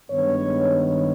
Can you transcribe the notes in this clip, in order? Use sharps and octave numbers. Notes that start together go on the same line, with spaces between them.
G2 D#3 G#3 B3 C#5
C#5